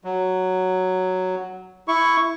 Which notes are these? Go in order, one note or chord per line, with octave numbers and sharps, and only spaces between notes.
F#3
E4 C#6